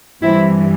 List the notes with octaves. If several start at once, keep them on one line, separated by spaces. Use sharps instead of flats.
G2 E3 G3 C4 E4